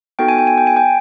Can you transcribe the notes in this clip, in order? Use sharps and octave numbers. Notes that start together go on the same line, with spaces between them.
B3 D#4 F#4 A4 G5
G#5
G5
G#5
G5
G#5
G5